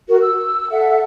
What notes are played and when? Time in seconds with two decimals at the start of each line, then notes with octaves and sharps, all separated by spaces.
0.08 F#4 A#4
0.21 E6
0.70 A4 E5 F#5